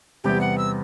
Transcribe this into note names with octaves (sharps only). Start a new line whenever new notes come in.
E2 C3 G3 B3 G4
F#5
E6